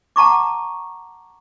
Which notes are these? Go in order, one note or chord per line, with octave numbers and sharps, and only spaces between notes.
F#5 A5 A#5 C#6 D6